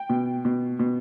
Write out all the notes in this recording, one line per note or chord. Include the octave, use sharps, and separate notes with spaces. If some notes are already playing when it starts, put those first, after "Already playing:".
Already playing: G5
B2
B2
B2